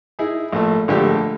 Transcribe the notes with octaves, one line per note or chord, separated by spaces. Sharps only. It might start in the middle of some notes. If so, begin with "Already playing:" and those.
D#4 E4 G#4
A#1 A3
A#1 D3 G#3 A3 G4